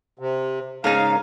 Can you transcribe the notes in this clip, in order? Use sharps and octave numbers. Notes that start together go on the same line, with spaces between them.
C3
G#2 C#3 D#4 A#4 F5